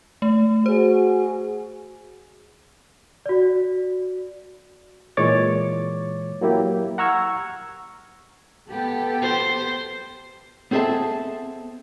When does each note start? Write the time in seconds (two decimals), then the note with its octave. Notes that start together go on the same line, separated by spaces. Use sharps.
0.22 A3
0.66 F#4 G#4 C5
3.26 F#4 D5
5.17 A#2 E3 G#3 C#5 D6 A6
6.41 F#3 A#3 E4 G4
6.98 F#5 A#5 C#6 E6 F6 G#6
8.68 B3 G4 A4
9.22 C5
10.71 B3 C4 G#4 A4 E5 A5